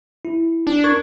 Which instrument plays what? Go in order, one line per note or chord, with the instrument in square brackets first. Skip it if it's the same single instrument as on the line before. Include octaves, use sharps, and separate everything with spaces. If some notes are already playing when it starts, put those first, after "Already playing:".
[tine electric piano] E4
[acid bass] D4
[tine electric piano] A#4 C#6 G#6